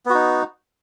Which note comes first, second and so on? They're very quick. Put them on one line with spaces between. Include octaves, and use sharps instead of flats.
B3 F#4 D#4